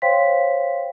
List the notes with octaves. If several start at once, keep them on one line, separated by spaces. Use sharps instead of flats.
C5 C#5 F5 G5 C6 B6